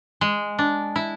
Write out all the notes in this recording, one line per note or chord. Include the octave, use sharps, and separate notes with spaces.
G#3
D4
E4